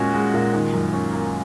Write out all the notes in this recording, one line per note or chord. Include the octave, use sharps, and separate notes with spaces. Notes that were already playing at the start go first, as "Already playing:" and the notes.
Already playing: A#2 G#3 C#4 F#4
G#3
A#2
D#3
F#2
C#4
A#3